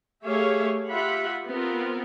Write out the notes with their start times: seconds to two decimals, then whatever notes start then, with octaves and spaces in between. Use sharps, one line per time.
0.24 A3 G4 G#4 C#5 E5 F5
0.90 F4 G4 E5 F#5 B5
1.48 B3 C4 F4 A#4